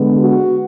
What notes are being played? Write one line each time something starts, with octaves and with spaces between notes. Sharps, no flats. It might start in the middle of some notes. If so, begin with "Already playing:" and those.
Already playing: D3 G#3 B3
F#4